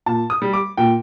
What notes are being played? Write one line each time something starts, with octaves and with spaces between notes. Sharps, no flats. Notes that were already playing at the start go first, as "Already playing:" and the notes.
A#2 A5
D#6
G3
D6
A#2 G5